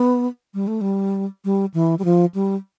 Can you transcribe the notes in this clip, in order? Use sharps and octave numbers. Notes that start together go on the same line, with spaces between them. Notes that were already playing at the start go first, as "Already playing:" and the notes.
Already playing: B3
G3
A3
G3
G3
E3
G3
F3
G3